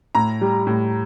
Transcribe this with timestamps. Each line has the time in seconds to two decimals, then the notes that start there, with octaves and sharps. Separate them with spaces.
0.15 A2 A#5
0.41 G3
0.67 A2